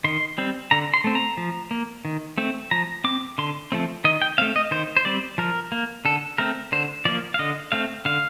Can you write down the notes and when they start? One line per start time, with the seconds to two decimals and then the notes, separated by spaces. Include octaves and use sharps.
0.04 D#3 C6
0.38 G3 C4
0.71 D3 A#5
0.94 C6
1.04 A3 C4
1.15 A#5
1.37 F3
1.71 A#3
2.05 D#3
2.38 A3 C4
2.71 F3 A#5
3.04 C4 D6
3.38 D3 C6
3.72 F3 A3 C4
4.04 D#3 D#5
4.22 G5
4.38 A3 C4 F5
4.56 D#5
4.71 D#3 C5
4.97 C5
5.05 G3 C4 D5
5.38 F3 A#4
5.72 A#3
6.05 D3 A4
6.38 A3 C4 A#4
6.72 D3 C5
7.05 F3 A#3 D5
7.34 F5
7.39 D3 D#5
7.72 A3 C4 F5
8.05 D3 F5